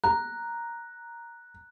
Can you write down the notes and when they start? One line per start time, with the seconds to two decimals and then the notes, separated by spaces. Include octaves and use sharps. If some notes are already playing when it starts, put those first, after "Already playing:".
0.04 A#5 F#6